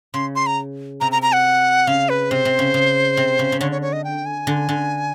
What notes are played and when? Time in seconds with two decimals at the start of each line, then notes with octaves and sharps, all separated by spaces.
0.14 C#3 C6
0.36 C6
0.47 A#5
1.00 C3 A#5
1.12 A#5
1.22 A#5
1.34 F#5
1.87 C#3 F5
2.09 B4
2.31 C3 C5
2.45 C3
2.59 C#3
2.74 C#3
3.17 C3
3.39 C#3
3.52 C#3
3.60 D3 C#5
3.71 C#5
3.82 C#5
3.93 D#5
4.04 G5
4.26 G#5
4.47 D3
4.69 D3